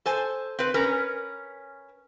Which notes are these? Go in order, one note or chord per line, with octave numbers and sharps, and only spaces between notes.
A4 C5 G#5
C4 B4
C#4 A#4 B4